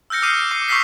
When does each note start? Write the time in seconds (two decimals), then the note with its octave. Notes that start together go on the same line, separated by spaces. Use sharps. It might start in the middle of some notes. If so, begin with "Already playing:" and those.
0.10 E6 F6 G6 A#6 C#7
0.22 D6 D#6 F6 G6 C7 D#7
0.51 D6 C7
0.68 C#6 D#6 E6 G6 B6 C7